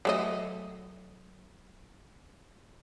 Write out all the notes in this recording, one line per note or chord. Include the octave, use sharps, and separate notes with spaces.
F#3 A3 D#5